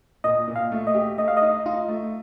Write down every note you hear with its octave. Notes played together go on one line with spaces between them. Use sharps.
A#2 D#5
A#2
F5
A3
D#5
G4
A3 D#5
F5
D#5
D#4
D#4 F4
A3